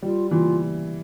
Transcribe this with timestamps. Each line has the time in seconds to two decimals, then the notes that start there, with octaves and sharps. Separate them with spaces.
0.02 G3 F4
0.31 E3 F4